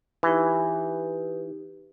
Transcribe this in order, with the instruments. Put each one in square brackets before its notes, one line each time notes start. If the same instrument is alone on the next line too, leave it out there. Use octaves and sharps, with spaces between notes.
[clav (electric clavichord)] E3 [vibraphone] D#4 G4 B4